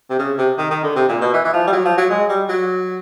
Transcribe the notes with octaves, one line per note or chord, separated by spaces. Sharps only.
C3
C#3
C3
D#3
D#3
D3
C3
A#2
B2
E3
E3
F3
G3
F#3
F3
F#3
G#3
G3
F#3